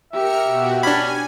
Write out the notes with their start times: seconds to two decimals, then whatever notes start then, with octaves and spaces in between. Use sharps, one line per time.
0.13 G4 A#4 E5 F6 C#7
0.44 B2 F#4
0.83 C#4 D4 G#5 B5